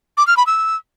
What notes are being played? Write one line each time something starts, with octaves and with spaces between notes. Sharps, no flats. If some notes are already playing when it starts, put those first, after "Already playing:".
D6
F6
B5
E6